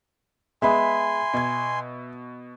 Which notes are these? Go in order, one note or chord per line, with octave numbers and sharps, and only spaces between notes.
G#3 B3 G#4 E5 G#5 B5 C6
B2 G#6